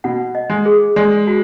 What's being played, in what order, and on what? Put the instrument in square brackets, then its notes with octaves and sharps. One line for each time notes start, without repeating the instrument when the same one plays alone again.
[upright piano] B2 [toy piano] F#5
[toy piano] D#5
[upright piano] G#3
[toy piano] G#4
[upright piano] G#3 [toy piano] D5
[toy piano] F#4